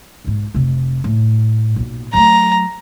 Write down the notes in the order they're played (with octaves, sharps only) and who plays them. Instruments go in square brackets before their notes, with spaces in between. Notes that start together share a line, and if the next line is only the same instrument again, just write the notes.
[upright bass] B1 G#2
F1 C3
A2
B1 A#2
[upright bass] F#3 A3 [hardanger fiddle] A#5